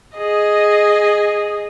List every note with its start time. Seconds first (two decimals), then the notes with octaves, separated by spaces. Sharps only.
0.18 G#4 D#5